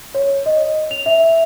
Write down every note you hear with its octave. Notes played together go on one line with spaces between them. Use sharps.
C#5
D#5
F7
E5